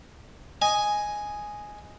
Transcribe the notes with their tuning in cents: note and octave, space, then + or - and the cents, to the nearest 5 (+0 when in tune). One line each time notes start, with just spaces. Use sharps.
D#5 +0 G#5 +0